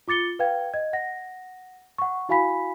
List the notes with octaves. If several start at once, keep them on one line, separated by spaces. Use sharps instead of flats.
F4 D6 A6 C#7 G7
B4 F5 G5 G#6
D#5 G#6
F#5 A#6
F#5 C#6
E4 F#4 F5 G#5 B5 B6